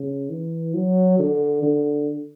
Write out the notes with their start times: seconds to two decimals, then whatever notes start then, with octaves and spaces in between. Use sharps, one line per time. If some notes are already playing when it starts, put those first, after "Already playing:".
Already playing: C#3
0.30 E3
0.74 F#3
1.19 D3
1.63 D3